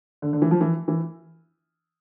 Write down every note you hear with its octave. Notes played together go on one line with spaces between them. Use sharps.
D3
D3
E3
F3
E3
E3